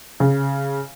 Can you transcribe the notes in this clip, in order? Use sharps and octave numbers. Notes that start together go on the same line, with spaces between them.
C#3